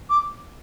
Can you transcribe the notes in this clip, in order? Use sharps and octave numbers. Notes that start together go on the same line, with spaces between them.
D6